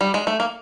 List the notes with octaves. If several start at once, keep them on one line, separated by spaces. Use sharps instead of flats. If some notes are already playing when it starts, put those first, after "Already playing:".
G3
G#3
A3
A#3